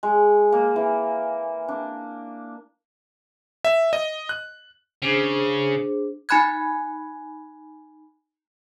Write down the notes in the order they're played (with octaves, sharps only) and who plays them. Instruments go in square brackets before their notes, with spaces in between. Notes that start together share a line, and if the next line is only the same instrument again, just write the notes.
[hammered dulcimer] G#3
A#3
E3
D4
[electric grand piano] E5
D#5
F#6
[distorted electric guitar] C#3 [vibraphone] D4 G#4 C5
[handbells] D#4 G#5 B5 F#6 G#6